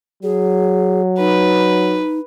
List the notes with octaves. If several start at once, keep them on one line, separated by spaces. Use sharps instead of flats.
F#3 G#4
D#4 B4